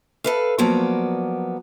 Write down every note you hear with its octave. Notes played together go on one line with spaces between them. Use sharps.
A4 B4 F5
F3 F#3 A#3 B3 D5